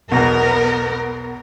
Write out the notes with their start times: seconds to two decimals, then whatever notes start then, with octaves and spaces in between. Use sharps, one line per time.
0.12 B1 E2 B3 A#4